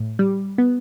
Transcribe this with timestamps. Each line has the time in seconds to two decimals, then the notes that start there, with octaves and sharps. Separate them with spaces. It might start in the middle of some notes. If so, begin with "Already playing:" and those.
Already playing: A2
0.19 G3
0.58 B3